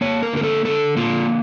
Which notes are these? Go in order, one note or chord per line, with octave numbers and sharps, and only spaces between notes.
A#3 C#5
A#4
D3 A#4
A4
D3 A4
A#3 F4